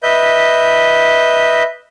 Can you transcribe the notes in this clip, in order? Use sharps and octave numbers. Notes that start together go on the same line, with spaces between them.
B4 D#5 E5 G6